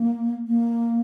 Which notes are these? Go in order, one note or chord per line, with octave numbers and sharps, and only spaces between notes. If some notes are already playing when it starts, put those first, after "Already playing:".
Already playing: A#3
A#3